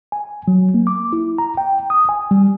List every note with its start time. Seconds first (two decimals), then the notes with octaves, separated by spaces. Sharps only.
0.12 G#5
0.48 F#3
0.74 A#3
0.87 D6
1.13 E4
1.38 A#5
1.57 G5
1.90 D#6
2.09 G#5
2.31 G3